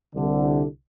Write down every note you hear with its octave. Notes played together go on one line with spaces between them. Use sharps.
C2 D3